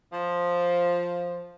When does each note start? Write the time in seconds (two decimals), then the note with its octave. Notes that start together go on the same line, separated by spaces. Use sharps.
0.13 F3